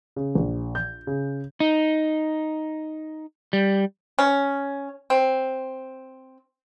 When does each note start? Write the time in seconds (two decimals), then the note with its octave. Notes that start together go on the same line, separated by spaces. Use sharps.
0.16 C#3
0.35 A#1
0.75 G6
1.07 C#3
1.60 D#4
3.53 G3
4.19 C#4
5.10 C4